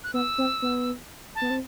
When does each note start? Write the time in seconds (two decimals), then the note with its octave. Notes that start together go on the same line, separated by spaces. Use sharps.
0.04 F#6
0.14 B3 E6
0.38 C4
0.62 B3
1.35 A5
1.41 B3
1.50 C4